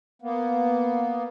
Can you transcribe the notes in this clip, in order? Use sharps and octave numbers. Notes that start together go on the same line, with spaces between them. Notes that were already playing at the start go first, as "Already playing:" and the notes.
A#3 B3